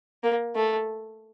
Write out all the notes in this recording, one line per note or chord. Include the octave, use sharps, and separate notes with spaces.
A#3
A3